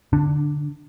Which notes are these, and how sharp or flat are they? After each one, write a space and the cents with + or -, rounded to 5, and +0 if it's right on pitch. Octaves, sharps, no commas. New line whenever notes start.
D3 +0 D4 +20